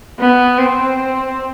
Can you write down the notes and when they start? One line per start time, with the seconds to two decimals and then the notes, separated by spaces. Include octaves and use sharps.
0.19 B3
0.58 C4